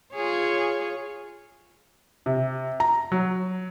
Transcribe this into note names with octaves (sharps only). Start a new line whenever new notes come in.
F4 G#4 C#5
C3
A#5
F#3